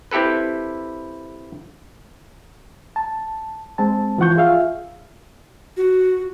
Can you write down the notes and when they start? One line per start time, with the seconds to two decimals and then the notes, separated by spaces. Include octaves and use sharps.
0.11 C4 E4 G4 A4 B4
2.96 A5
3.78 G#3 C4 A5
4.18 E3 F3 F4 F#5 C#6 G6
4.36 F4 G#4 E5 F5
5.77 F#4